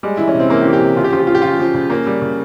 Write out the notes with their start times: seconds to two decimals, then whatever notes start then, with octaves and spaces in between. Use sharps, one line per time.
0.03 G3 G#3
0.17 E3 E4
0.28 C#4
0.34 C3
0.39 C4
0.50 E3 A#3
0.61 G4
0.65 E3
0.73 G4
0.81 C3
0.97 C#3 F4
1.04 G4
1.12 F3 F4
1.20 G4
1.27 F3 F4
1.35 G4
1.42 C#3 F4
1.60 F3
1.74 C#3
1.90 C#3 A#3
2.07 G3
2.22 C#3